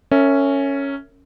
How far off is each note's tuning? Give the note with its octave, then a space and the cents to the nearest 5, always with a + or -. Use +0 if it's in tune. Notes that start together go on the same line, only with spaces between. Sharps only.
C#4 +0 A#4 -35 E5 +0